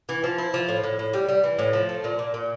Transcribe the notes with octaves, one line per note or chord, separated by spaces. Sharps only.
E3
F3
E4
F3
A2
A2
A2
G3
G3
E3
A2
F3
A3
A#2
A#2
A#2